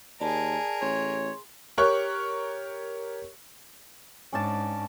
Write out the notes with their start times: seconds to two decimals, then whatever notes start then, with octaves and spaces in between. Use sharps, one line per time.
0.20 D#2 G#4 A#4 D5 A5
0.82 A1 C#5 C6
1.78 G4 A#4 C#5 C#6 F#6
4.33 G#2 C#4 D4 A5